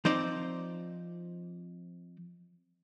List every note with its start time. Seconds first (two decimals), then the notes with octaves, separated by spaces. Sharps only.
0.05 F3 C4 D#4 C5 D5